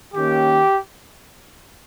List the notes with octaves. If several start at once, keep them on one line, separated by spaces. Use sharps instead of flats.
D#3 A#3 C#4 G4